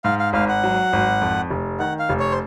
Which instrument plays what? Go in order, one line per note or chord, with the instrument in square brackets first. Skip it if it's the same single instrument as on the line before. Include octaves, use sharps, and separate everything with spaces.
[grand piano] G#2 [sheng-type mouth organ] F5
[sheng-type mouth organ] F5
[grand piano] G#1 [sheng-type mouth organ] F5
[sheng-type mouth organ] F#5
[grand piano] F#3
G#1
F2
F1
[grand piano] D#3 [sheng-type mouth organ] F#5
[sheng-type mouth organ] F5
[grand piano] F1
[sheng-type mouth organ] C#5
C5